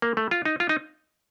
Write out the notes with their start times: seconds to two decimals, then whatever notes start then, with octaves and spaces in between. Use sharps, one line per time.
0.02 A#3
0.17 A3
0.31 F4
0.45 D#4
0.60 F4
0.69 D#4